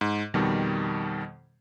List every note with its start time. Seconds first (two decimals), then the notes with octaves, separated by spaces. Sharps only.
0.01 G#2
0.34 F2 B2 D#3 G3